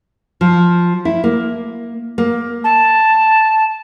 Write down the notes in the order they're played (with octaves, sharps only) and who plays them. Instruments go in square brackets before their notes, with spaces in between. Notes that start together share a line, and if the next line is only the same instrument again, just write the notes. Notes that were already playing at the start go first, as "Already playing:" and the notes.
[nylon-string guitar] F3
E4
A#3
A#3
[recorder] A5